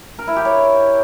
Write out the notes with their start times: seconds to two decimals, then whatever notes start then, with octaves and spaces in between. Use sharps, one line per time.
0.19 A#4
0.27 E4
0.36 G4
0.45 C#5